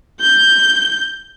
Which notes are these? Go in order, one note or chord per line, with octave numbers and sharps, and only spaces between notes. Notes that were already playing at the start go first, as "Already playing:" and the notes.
G6